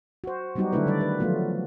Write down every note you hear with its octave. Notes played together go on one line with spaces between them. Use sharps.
F#4 C5
F#3 G3 B3 D#4 F#4 G4
D3 F#3 A3 D4 E4 B4
D3 D#3 G3 D5
B4
F3 F#3 A3 B3 F4